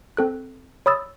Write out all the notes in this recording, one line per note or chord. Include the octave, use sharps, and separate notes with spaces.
C4 A4 F#6
C#5 B5 D#6 E6 A6